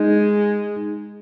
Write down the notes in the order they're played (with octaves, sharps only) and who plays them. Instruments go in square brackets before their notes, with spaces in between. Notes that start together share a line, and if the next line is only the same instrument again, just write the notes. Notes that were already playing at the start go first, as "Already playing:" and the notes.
Already playing: [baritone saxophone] G#3 [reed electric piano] D#4